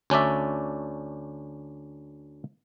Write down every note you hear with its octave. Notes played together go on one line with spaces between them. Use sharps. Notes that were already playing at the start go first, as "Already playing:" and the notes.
D2 C#4 D4 D5 E5